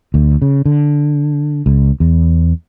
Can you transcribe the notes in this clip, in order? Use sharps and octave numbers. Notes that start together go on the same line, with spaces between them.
D2
C#3
D3
C#2
E2